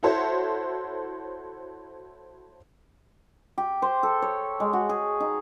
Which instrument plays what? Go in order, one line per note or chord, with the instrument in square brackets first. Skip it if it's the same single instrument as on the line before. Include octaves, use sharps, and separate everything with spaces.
[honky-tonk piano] E4 F#4 A4 C5 C#5 E5
[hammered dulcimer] G4
C5
A4
C#5
G#3
F#4
G#4
D#4